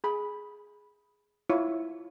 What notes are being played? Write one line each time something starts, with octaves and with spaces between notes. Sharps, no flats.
G#4 B5
E4 F4 C#5